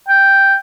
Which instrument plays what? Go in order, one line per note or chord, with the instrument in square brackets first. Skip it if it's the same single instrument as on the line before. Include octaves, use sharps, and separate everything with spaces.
[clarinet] G5